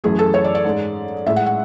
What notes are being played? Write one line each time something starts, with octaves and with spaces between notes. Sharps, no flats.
F#2 E3 A3 G#4
A4
C#5
D5
D5
G#2 G#3
A2 G#3 E5
F#5
F#5